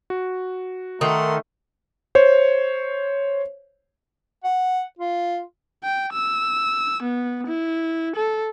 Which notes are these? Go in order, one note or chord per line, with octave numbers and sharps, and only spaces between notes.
F#4
D#3 A3 A#4 F#5 C6
C5 C#5
F#5
F4
G5
E6
B3
E4
A4